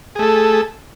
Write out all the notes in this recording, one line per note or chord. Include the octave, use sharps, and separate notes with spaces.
A3 G#4 A4